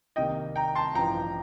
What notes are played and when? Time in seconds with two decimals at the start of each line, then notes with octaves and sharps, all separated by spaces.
0.16 C2 C3 D#3 A#3 D#5 G5
0.56 G5 A#5
0.75 A5 C6
0.95 A1 G2 F3 G5 A#5